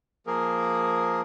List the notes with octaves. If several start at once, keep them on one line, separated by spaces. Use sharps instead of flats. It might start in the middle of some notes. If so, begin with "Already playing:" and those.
F3 A#3 G#4 A#4